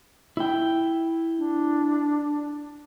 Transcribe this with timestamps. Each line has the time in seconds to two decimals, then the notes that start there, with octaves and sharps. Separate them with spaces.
0.37 E4 G5
1.38 D4